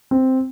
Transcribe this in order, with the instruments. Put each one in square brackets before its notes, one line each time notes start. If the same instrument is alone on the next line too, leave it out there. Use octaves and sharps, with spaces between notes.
[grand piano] C4